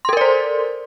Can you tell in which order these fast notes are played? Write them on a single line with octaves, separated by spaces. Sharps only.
C6 A4 A#4 D5 C5